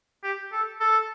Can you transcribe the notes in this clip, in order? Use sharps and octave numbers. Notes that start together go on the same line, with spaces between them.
G4
A4
A4